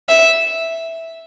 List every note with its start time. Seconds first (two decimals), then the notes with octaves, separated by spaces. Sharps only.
0.09 E5